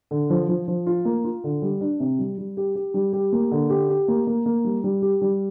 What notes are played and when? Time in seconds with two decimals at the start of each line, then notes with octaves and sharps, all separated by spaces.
0.11 D3
0.30 F3
0.49 F3
0.68 F3
0.86 F4
1.05 A#3
1.24 F4
1.44 D3
1.62 G3
1.81 D4
2.00 C3
2.19 G3
2.38 G3
2.57 G4
2.75 G4
2.94 G3
3.13 G4
3.32 A#3
3.51 D3
3.70 G4
3.89 G4
4.08 A#3
4.27 A#3
4.46 A#3
4.64 G3
4.84 G3
5.02 G4
5.21 G3